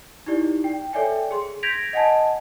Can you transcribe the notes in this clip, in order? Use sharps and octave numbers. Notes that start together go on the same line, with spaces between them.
D#4 E4 G4 D5
G5
A4 C#5 D5 E5 G5 G#5
G#4 C6
G6 G#6 A#6 B6 D7 F7
D#5 F#5 G#5 A5